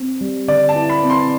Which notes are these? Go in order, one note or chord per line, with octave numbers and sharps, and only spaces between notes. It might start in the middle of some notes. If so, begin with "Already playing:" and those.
Already playing: C4
G3
D3 D5
A5
E4
B5
C4
C6